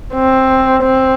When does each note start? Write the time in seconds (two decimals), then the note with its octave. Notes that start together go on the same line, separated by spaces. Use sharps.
0.14 C4
0.83 C4